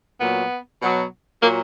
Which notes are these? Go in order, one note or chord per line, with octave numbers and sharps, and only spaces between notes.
A#2 F#3 B3
B2 F#3
A#2 F#3 A#3